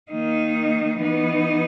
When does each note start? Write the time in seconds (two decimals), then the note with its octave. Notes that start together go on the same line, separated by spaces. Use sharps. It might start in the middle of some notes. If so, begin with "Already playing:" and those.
0.11 D#3 A#3 D#4
1.00 E3 B3 D#4